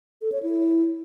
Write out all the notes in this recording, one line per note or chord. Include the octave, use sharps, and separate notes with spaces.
A4
C#5
E4